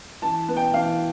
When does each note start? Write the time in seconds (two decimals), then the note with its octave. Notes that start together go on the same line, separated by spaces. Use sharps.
0.22 E3 A5
0.48 B3
0.57 G5
0.74 E3 F5